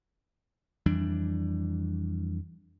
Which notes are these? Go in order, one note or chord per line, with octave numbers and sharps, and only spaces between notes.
F2 E3 G3 D4